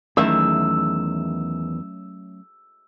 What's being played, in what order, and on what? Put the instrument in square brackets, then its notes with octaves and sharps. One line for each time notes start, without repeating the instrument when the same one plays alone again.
[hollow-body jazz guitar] E2 D#3 E5 [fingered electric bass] F#3 A3 C#4 [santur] E6